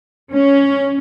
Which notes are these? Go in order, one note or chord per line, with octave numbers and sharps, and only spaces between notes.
C#4